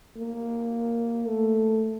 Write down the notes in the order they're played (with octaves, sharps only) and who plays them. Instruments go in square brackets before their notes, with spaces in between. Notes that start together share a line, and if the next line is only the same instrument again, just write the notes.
[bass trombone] A#3
A3